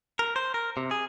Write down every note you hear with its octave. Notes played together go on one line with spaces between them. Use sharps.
A#4
C5
A#4
C3
G#4